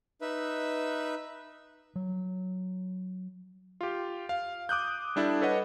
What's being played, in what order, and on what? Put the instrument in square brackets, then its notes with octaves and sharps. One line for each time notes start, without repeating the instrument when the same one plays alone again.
[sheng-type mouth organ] D#4 B4 E5
[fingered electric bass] F#3
[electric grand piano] F4 G4
F5
D6 D#6 F#6 G6
G3 D4 E4 A4
A4 B4 C#5 D#5 F#5